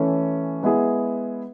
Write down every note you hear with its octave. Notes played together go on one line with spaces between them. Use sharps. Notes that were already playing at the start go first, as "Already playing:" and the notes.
Already playing: E3 A3 C#4
G#3 B3 E4 G#4